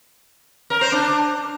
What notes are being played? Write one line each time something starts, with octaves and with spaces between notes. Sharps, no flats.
A#4
C5
D4